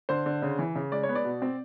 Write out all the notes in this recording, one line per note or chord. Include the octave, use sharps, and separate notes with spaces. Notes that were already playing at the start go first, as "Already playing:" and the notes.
D3 C5
D3
C#3
E3
C#3
G#3 D5
C#5
B3
D5
B2
C4